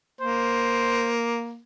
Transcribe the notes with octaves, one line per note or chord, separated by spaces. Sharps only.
A#3 C5